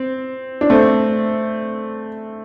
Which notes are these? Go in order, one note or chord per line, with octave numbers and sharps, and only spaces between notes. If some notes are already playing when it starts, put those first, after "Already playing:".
Already playing: C4
D4
A3 C4